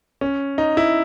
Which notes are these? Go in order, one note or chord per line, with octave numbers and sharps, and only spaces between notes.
C#4
D#4
E4